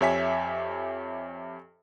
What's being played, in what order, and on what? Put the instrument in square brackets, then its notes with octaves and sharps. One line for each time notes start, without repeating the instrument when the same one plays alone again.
[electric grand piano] F2 G4 C#5 E5 G#5 B6